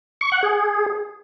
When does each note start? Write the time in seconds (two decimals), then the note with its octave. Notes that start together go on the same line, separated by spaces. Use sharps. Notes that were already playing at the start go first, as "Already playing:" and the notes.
0.21 C#6
0.32 F#5
0.43 G#4